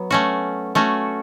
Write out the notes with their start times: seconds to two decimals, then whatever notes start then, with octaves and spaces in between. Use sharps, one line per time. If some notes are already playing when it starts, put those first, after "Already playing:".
Already playing: F#3 B3
0.11 A3 C#4 F#4
0.75 A3 C#4 F#4